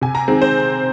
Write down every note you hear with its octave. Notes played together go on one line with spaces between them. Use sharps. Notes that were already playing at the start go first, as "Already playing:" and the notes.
C3 G#5
A#5
D#3 G#3 C4
C5